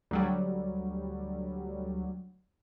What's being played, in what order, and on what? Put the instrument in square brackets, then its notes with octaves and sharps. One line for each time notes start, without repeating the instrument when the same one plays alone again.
[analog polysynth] D2 F#3 G3